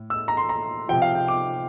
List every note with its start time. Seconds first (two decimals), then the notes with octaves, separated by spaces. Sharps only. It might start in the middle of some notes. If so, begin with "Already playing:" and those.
Already playing: A2
0.10 E6
0.28 A#5
0.37 C6
0.49 A#5
0.89 C3 F3 G5
1.02 F5
1.15 G5
1.28 D6